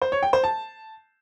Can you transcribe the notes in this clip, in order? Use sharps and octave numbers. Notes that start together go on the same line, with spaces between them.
C5
C#5
G5
C5
A5